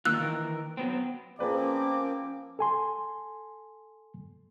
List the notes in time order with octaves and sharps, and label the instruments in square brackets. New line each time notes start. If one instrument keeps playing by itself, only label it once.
[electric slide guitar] D#3 A#3 F4 [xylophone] E6 F#6
[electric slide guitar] D#3 E3 A#4
F#3 B3 C4
[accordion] F3 A#3 C4 [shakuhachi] C#4 [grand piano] G#4 B4 D5 [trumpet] D6
[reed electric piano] A4 G#5 C6